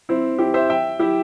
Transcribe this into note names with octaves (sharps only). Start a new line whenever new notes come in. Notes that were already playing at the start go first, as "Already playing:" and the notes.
C4 E4
E4 G4
C5 E5
E5 G5
E4 G4